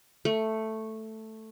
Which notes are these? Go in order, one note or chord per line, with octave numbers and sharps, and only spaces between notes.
A3